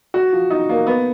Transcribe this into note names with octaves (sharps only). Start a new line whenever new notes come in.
F#4
F3
D#4
A#3
B3